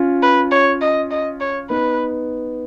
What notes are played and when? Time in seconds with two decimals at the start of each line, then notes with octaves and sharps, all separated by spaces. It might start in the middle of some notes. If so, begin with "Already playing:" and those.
Already playing: C#4 F4
0.23 B4
0.52 C#5
0.81 D#5
1.11 D#5
1.41 C#5
1.70 B3 D#4 B4